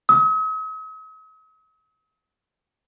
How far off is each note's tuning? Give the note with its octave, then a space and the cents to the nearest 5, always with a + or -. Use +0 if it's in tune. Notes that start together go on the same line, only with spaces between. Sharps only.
D#6 +45